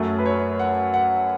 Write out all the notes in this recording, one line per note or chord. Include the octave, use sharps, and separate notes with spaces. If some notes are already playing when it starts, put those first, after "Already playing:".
Already playing: F#2 F#3 A3
B4
C#5
F#5
F#5